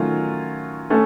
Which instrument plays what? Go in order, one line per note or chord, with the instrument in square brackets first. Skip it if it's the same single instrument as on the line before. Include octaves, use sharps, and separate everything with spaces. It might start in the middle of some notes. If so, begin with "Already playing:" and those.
Already playing: [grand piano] D#3 F#3 A3 C#4 F4
A3 C#4 A4